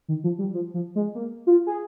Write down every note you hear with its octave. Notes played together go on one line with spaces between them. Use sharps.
D#3
F3
G3
F3
F3
G#3
A#3
F4
G#4